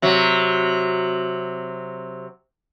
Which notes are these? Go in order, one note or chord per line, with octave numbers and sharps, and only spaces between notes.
C3 F#3